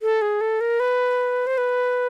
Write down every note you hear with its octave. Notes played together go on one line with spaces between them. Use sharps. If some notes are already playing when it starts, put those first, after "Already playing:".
A4
G#4
A4
A#4
B4
C5
B4